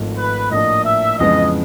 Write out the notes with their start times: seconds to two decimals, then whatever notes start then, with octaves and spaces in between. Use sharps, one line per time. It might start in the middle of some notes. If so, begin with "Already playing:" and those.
Already playing: G#1 G#2 F3 A3
0.18 B4
0.51 A2 F3 A#3 D4 D#5
0.85 E5
1.18 F2 C#3 E3 G#3 B3 D#5